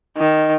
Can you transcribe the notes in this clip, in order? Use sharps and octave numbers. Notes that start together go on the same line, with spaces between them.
D#3